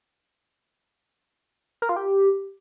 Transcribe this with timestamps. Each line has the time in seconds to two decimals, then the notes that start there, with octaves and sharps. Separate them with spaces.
1.82 A#4
1.89 F4
1.96 G4